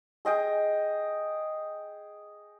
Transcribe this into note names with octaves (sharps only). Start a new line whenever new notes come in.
G#4 D#5 G5 G#5